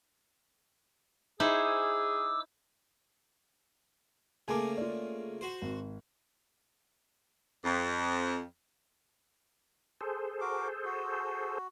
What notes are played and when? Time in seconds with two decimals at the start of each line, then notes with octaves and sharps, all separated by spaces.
1.40 D#4 E4 G#4 C5 D6 E6
4.48 C#3 A3 A#3 G#5 A5 D6
4.77 F4 D5
5.41 F#4 C5
5.62 G#1
7.65 F2
10.01 G#4 A4 C5
10.41 F#4 A#4 D6
10.85 F#4